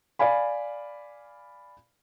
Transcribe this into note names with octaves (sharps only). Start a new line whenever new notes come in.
D5 F5 G#5 B5